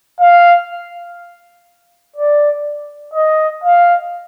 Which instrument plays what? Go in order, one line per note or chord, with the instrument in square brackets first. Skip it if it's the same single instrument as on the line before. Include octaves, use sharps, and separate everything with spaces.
[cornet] F5
D5
D#5
F5